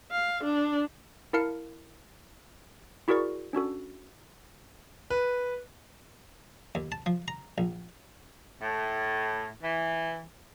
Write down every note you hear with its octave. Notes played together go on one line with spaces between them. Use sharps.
F5
D4
E4 A#4 F5 A5 F6 C#7
E4 F#4 G#4 A#4 D5 C#6
C#4 D4 F#4 A4
B4
D#2
A5
F3
A#5
A#1
A2
E3